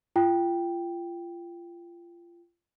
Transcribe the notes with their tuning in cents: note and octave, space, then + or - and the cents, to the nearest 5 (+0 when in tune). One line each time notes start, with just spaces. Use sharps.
F4 -25 G5 +0